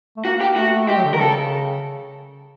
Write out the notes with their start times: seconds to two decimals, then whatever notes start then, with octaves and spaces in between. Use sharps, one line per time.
0.17 A3
0.25 A#3 F#4
0.41 G4
0.56 A3 F#4
0.88 G#3 G4
0.97 F#3
1.04 D3
1.13 D#3 A#4
1.21 C#3 A4